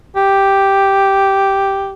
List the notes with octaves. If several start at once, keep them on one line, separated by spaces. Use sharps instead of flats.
G4